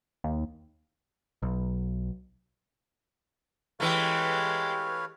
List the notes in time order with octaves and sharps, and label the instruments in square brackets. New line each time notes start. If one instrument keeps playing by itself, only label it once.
[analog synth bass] D#2
[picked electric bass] B1
[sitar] E3 A3 [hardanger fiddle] G#3 G4 [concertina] B4 C#5 F5